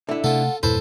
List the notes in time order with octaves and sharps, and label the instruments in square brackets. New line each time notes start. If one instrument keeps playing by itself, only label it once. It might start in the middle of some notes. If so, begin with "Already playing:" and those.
[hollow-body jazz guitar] D3 E4 [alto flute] E5
[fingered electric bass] C3 A3 [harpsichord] F4 A4 [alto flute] F#5
[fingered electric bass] E2 G2 A#2 [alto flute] E4 [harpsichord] A4 C5 [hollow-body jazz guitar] B4